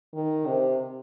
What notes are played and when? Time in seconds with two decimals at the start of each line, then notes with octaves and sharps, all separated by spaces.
0.14 D#3
0.46 C3